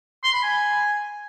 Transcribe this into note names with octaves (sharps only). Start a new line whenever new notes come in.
C6
B5
G#5